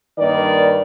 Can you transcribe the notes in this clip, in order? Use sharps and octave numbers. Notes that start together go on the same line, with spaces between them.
G2 D#3 A#3 B4 D5